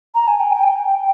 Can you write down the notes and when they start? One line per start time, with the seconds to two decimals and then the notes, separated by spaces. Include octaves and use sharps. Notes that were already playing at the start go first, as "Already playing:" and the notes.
0.15 A#5
0.28 G#5
0.40 G5
0.54 G5
0.63 G#5
0.66 G5